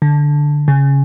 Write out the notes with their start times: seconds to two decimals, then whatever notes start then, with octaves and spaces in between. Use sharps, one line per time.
0.02 D3
0.68 C#3